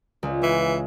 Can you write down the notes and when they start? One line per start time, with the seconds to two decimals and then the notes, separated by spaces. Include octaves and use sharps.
0.23 C#2
0.43 E3